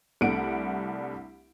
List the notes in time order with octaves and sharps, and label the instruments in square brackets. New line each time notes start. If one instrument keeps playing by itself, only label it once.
[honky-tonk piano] C2 A3 D4 F#5 D7